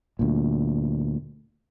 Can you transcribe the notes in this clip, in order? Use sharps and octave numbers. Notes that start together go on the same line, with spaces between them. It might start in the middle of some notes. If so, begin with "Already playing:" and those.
D2 A#2